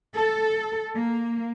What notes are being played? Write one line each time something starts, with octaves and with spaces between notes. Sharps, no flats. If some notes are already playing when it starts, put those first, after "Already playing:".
A4
A#3